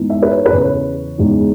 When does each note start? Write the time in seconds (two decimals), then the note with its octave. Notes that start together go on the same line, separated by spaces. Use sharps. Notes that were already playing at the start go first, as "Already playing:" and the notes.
Already playing: G#2 E3 B3 D#4
0.10 E5
0.22 B4
0.31 C#5
0.46 B4
0.52 E2 C#3 E3 C#5
1.18 E2 C#3 G#3 B3 D#4